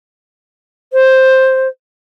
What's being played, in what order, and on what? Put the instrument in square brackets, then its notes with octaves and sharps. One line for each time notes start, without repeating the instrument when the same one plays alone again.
[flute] C5